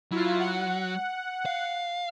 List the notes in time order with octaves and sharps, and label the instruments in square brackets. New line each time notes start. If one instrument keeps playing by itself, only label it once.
[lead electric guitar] F#3 [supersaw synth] E4 F4
[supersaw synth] F#5
[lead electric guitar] F5